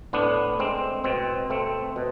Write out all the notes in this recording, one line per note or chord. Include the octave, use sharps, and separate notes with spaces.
A2 B3 D4
G#3 C4
B2 C4
A3 C4
B2